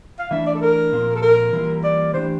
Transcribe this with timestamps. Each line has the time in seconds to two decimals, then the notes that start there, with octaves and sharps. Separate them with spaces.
0.19 F5
0.31 E3 A3 D4 E5
0.46 D5
0.55 A4
0.62 A#4
0.92 A#2 F3 C4 F4
1.16 A4
1.22 A#4
1.53 E3 G3 A#3 F4
1.84 D5
2.14 E3 A3 D4 G4 C5